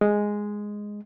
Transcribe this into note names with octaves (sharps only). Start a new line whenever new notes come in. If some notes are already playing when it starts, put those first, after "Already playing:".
G#3